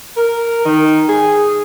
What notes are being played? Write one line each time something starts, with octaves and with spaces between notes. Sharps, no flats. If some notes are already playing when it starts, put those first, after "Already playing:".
A#4
D#3
G#4